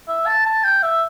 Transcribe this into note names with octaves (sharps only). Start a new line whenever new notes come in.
E5
A5
A5
G5
E5